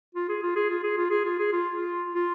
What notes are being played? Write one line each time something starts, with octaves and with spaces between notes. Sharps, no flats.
F4
G#4
F4
G#4
F4
G#4
F4
G#4
F4
G#4
F4
F4
F4